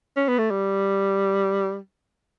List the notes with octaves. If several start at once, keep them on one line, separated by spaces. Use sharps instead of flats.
C#4
B3
A3
G3